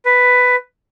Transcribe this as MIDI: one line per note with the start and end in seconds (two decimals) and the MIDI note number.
0.05 0.56 71